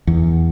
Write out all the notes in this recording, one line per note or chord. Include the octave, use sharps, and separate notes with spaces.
E2